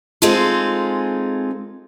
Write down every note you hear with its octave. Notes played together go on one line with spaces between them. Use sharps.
G#3 C4 D#4 F4 G#4 A4